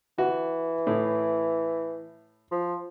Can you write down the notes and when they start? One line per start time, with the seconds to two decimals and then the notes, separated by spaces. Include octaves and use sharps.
0.18 E3 F#4
0.87 A2
2.51 F3